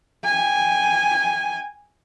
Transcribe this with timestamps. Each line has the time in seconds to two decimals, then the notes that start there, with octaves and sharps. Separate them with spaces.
0.25 G5 G#5